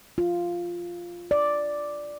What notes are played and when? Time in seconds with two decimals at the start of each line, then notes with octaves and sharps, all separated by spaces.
0.18 F4
1.31 D5